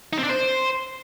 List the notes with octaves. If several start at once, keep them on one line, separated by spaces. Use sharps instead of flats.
D#4
C4
D4
C5